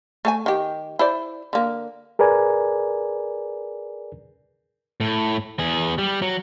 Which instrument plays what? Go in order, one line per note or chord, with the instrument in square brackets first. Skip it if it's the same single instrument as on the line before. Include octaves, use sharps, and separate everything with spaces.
[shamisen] A3 A4 G#5
D#3 G4
E4 C5 D5
D3 A#3
[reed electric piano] G#4 A#4 B4 D5 G#5
[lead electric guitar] A2
E2 G#4
G3
F#3